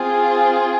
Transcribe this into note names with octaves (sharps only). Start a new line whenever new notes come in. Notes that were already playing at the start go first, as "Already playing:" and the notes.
Already playing: C4 F4 G#4